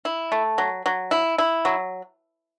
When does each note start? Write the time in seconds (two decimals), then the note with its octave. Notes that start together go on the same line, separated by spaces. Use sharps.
0.05 E4
0.32 A3
0.58 F#3
0.86 F#3
1.11 E4
1.38 E4
1.65 F#3